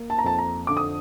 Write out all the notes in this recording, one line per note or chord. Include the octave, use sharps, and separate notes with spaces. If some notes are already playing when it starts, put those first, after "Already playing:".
Already playing: A#3
A5
A#5
F2 A5
A#5
D3 D6
D#6